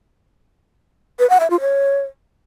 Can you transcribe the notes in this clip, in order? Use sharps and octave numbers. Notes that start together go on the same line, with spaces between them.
B4
F#5
E5
F4
C#5